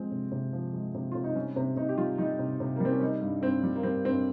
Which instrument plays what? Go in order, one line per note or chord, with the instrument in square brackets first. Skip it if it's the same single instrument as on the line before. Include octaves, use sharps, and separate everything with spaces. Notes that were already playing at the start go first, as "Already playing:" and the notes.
Already playing: [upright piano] F3 G#3 C4
C3
C3
F3
G#3
C3
C3 F4
D#4
G3 C#4
C3 C4
C3 D#4
G4
G3 F4
G3 D#4
C3
C3
A#3
G3 C4
C#4
G3 D#4
G2
G2 C4
G3
A#3
G3 C4
G2 C4